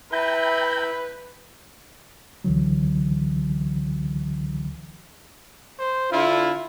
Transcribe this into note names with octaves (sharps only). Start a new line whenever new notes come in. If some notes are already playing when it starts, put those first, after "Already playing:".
E4 B4 E5 G5 A#5 B5 G6
C#2 D3 E3 F#3
C5
D3 D4 E4 F4